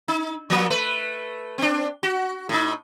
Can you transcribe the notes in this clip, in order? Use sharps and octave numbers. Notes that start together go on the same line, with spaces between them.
D#4
F3 A#3
A3 B4
C4 D4
F#4
A2 D#4